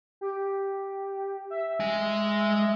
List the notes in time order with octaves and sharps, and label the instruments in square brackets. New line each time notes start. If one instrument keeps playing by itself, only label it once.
[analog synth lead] G4
E5
[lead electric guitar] G#3 G#5